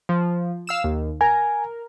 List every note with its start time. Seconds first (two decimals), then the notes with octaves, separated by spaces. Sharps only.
0.09 F3
0.67 F5 E6 E7
0.84 D#2
1.21 A#4 G#5